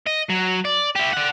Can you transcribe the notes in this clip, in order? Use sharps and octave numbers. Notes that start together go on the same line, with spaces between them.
D#5
F#3
D5
E4 G4
D5 F#5